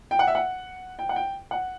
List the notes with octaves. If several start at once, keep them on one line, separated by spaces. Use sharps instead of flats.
G5
F#5
E5
F#5
G5
F#5
G5
F#5